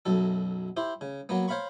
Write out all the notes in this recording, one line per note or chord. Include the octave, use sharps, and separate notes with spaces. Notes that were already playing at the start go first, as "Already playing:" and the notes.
B1 F#2 A4
E4 G4 C5
C#3
F#3 A#3 B3
C5 C#5 F5 A#5 B5 C#6